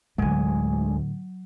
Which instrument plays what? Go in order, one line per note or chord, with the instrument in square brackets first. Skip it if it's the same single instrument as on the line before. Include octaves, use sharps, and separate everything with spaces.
[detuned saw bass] D2 [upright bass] A2 D3 [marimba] F#3 [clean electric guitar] G#3 G#5